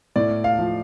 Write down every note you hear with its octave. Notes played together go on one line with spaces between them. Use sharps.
A2 D5
F5
F3